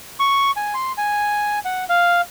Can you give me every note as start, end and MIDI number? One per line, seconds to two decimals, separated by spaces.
0.20 0.51 85
0.56 0.74 80
0.74 0.92 84
0.98 1.59 80
1.65 1.84 78
1.89 2.21 77